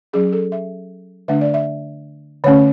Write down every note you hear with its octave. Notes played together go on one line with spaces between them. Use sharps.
F#3 C#4 G#4
A4
E5
D3 A3 D4 E5
D5
E5
D3 A3 C#4 C#5